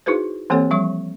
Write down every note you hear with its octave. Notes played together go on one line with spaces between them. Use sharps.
D#4 E4 F#4 G#4 B4 C5
E3 A#3 C4 G4 A4 C#5
F3 G3 C#6